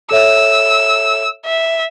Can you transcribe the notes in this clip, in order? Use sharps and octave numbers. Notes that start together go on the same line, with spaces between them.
A4 C#5 E5 E6
E5